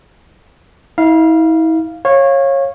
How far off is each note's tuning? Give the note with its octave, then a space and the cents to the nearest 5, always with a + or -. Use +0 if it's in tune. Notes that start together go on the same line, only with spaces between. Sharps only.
E4 -40 F5 -10
C#5 -20 F5 +0